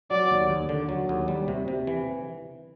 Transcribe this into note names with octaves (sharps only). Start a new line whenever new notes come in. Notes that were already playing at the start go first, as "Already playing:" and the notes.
F#3 D5
D#2
D#2
D3
F#3
D#2
G3
C3
C3
E3